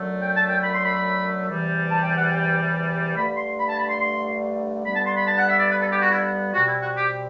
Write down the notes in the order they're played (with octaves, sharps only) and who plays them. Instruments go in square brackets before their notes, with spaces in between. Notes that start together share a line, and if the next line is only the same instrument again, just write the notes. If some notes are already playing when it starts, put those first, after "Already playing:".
Already playing: [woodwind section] F#2 D3 F#3 A3
G5
A5
G5
B5
C6
B5
B5
E2 C3 E3 G3
A5
G5
F#5
G5
G2 D3 A3 B5
C6
B5
A5
B5
C6
C6
G2 D3 G3 B3 B5
A5
C6
B5
A5
F#5
E5
D5
B4
A4
G4
F#4
E4
B2 G3 C4 F#4
E4
F#4
G4